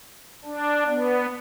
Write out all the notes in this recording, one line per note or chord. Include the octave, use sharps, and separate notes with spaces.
D4
B3